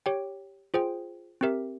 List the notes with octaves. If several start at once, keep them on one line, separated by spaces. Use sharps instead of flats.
G4 C#5 G5
F4 G#4 C5 G5
C4 G4 A#4 E5